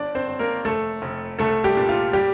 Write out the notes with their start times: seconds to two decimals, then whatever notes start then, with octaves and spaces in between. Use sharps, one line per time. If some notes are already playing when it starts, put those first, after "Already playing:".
Already playing: G1 D4 D5
0.15 C4 C5
0.27 G1
0.39 A#3 A#4
0.65 F1 A3 A4
1.02 F1
1.39 C2 A3 A4
1.64 G3 G4
1.77 A#2
1.89 F4
2.13 G3 G4